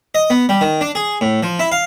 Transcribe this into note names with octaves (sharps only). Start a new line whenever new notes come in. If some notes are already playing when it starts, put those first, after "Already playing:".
D#5
B3
G3
D#3
D4
G#4
A2
F3
E4
F5